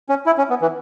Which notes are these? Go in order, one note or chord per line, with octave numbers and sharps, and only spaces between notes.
C#4
E4
C#4
B3
E3